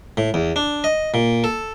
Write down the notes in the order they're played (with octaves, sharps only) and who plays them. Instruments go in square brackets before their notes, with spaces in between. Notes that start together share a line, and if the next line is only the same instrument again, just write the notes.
[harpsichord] A2
E2
D4
D#5
A#2
A4